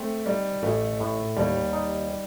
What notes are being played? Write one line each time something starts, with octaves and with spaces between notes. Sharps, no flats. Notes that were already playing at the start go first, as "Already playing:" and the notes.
Already playing: A3 C4
G3 D#4
A1 A3
A2
D#2 G3
D#4